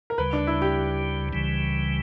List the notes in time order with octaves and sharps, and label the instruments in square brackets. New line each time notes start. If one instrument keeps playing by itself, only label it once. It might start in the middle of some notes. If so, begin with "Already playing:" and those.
[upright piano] A#4
[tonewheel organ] D2 C#3 G3 [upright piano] B4
[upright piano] D4
E4
G4
[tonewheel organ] C#2 C#3 E3 G3